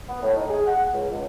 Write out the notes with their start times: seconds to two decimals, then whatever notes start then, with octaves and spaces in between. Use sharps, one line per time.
0.08 B3
0.22 A2
0.36 D#4
0.50 G#4
0.66 F#5
0.93 C#2
1.10 C#2